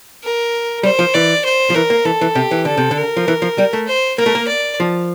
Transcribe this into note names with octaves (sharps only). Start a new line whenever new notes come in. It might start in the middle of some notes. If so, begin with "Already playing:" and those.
A#4
G3 C5
F3
E3 D5
C5
F3
E3 A#4
A#3
E3 A4
E3
C3 G4
E3
D3 A4
C3
D3
A#4
F3
E3
F3
G3
A3
C5
A#3 A#4
A3
A#3
D5
F3